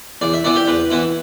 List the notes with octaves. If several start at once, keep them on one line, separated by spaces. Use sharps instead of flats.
E2 D5
E5
E3 B3 E4 D5
G4
E2 B4
E3 B3 E4